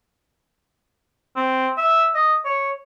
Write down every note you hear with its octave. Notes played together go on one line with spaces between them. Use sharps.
C4
E5
D#5
C#5